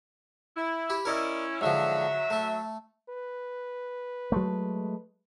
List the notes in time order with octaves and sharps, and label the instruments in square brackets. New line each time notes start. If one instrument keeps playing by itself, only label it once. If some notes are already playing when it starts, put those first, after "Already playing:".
[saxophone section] E4
[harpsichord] G4 B5
[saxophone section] C#4 E4 [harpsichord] A#4 D5 D#5
[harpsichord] G#2 D3 F3 [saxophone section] F#3 E5
[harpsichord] A3 A4
[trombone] B4
[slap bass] F#3 G#3 A3